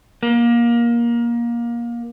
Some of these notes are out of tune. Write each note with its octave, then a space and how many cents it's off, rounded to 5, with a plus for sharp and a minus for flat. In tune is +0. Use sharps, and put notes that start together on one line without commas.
A#3 +20